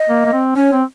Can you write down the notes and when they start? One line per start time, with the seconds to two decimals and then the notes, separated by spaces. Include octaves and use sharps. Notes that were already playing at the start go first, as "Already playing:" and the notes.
Already playing: D#5
0.09 A#3
0.26 A#3
0.33 C4
0.56 C#4 C#5
0.72 C4